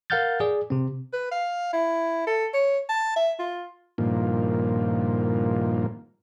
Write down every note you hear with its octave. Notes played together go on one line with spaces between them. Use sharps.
A#4 F5 F#5 F6 G6 A6
G#4 D5
C3 C4
B4
F5
E4
A4
C#5
A5
E5
F4
G2 A#2 D#3 F3 A#3